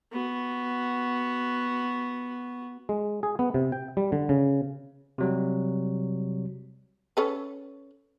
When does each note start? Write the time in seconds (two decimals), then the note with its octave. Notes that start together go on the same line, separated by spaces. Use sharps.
0.12 B3 F#4
2.89 G#3
3.23 G#4
3.39 B3
3.54 C3
3.72 G5
3.97 G3
4.12 D3
4.29 C#3
5.18 C3 F#3 G3
7.17 C#4 A4 B4